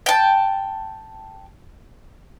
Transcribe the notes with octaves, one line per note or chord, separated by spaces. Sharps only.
G5 A5